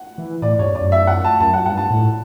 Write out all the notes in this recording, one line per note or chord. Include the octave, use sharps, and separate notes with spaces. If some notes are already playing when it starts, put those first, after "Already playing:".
Already playing: F#5
E3
A2 D5
G2 C#5
F#2 D5
E5
F#5
A5
F#2 A5
F#5
G2 F#5
A5
A2